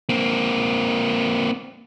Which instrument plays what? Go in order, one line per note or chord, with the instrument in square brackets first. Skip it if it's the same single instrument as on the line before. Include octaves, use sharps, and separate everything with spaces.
[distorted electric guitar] A#3 C4